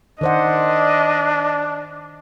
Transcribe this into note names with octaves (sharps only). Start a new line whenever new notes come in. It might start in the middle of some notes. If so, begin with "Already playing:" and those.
D#3 D4 C5 D#5 F#5